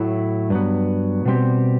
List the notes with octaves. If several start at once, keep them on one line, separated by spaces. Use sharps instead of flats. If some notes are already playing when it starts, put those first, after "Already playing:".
Already playing: A2 F#3 A3 E4
G2 F#3 B3
B2 G3 C4 G4